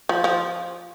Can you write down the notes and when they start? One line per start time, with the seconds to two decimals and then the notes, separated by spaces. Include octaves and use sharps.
0.09 F3
0.24 F3